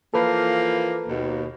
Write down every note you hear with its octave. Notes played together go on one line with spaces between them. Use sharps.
E3 F3 A#3 A4 B4
D#2 B2